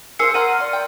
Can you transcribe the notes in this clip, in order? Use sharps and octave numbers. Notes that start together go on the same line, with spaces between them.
G#4 A#4 C5 F5 E6 C#7
F#5 A#5 C6 F6 D#7
D5 C6
G5